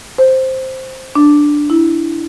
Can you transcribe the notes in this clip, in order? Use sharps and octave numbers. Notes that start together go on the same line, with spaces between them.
C5
D4
E4